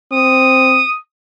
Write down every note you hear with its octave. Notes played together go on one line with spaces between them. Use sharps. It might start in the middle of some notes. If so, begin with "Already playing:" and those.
C4 D#6